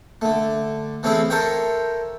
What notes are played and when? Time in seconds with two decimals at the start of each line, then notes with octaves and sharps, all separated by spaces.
0.21 D3 A3
1.03 E3 A3 C4 C#4 E4 G#4
1.30 A4 A#4 C5 C#5 E5 G5